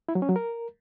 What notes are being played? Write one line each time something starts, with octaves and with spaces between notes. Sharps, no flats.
E4
F#3
C#4
F#3
A#4